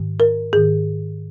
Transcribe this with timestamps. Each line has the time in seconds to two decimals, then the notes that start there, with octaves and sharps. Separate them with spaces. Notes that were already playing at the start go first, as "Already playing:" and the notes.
Already playing: G#2 D#3
0.20 A#4
0.53 G#2 D#3 G#4